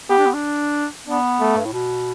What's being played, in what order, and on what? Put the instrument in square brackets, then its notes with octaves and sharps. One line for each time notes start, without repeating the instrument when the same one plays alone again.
[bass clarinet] B3 [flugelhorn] G4
[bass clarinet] D4
B3
D4
[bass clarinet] B3 [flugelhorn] D4
[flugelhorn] A3
[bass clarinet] G2
A2
B2